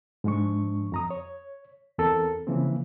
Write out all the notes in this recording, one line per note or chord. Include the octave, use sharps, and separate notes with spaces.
G#2 F3 G#3 D4 C#6
F2 A#5 D#6
C#5
E2 C4 A4 A#4
C#3 E3 F3 A#3 C4